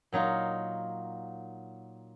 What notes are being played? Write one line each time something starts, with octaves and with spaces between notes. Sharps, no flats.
A#2 F#3 D#4 F4